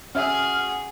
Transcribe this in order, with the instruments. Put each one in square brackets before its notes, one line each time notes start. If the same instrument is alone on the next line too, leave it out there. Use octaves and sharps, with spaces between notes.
[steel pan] C#4 E5 [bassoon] F#4 [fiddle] G#4 [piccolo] F6